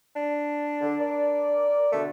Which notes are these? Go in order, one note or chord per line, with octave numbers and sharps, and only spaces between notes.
D4
D3
A#4 D5
B2 D3 A3